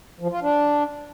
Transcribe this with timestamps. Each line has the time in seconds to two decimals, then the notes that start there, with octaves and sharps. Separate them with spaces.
0.20 F3
0.31 F4
0.42 D4